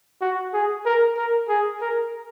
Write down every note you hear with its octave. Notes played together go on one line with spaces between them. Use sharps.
F#4
G#4
A#4
A#4
G#4
A#4